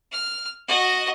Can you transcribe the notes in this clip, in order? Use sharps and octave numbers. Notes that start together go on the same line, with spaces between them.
F6
F#4 D#5